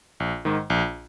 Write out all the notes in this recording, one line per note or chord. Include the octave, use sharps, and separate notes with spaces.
A#1
G#2 D#3
A#1